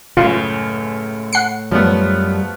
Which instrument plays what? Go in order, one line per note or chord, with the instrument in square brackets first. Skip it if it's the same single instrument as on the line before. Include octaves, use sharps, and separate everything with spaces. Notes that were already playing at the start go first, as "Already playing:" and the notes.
[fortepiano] C#2 F#2 [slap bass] A2 [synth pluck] F4
[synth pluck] F#5 C7 C#7
[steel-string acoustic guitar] F#2 G3 [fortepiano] F3 A3 B3